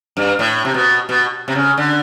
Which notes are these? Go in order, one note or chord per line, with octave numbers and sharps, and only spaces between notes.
G2
A2
C3
B2
B2
C3
C#3
D3